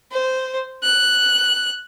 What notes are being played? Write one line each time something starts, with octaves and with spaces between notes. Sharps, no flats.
C5
F#6